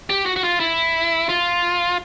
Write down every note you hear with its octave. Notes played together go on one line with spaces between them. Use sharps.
G4
F#4
F#4
F4
E4
F4